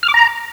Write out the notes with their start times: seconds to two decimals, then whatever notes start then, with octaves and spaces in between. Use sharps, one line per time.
0.03 F6
0.08 D6
0.14 A#5